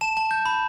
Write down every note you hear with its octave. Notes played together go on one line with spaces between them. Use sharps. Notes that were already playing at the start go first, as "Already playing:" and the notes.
A5 E7
A5
G6
B5